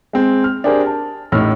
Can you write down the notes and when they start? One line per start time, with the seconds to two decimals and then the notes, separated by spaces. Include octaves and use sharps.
0.13 G#3 C4
0.44 F6
0.64 D4 G4 G#4 A#4 C5
0.86 A5
1.32 A1 A2 D#4 E6 F6